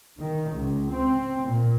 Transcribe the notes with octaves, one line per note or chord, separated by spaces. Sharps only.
D#3
C#2
C4
A#2